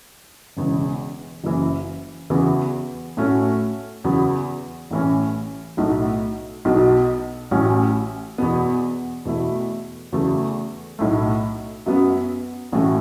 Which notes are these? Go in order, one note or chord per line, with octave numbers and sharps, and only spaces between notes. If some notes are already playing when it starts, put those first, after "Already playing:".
E1 E2 C#3
F#1 F#2 E3
E2 C#3 E3 B3 F#4
A2 A3 C#4 F#4
E2 C#3 F#3 B3
A1 A2 E3 C#4
B1 A2 A3 F#4
B1 B2 F#3
A1 A2 F#3 C#4
E2 B2 B3
E2 B2 A3 E4
E2 C#3 F#3 A3
B1 A2 A3
F#2 F#3 B3
A1 A2 E3 A3 F#4